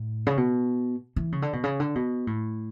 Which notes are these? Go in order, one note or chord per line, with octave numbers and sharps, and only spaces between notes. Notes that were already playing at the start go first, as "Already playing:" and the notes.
Already playing: A2
C#3
B2
E3
C#3
D3
B2
C#3
D3
B2
A2